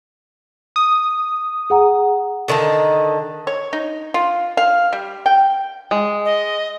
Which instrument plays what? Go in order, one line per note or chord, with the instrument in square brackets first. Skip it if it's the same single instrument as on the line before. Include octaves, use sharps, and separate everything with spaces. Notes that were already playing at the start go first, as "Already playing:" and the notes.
[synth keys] D#6
[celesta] G#4 F#5 A#5
[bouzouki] D3 D#3 D#4 A5
[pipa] C#5
D#4
F4
F5
G3
G5
[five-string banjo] G#3
[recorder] D#5